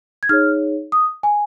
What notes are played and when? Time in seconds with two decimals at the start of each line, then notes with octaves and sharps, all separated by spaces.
0.23 G#6
0.29 D#4 G#4 C#5 F6
0.92 D#6
1.23 G#5